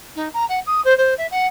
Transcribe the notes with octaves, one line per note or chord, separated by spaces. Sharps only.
D#4
A#5
F#5
D#6
C5
C5
E5
F#5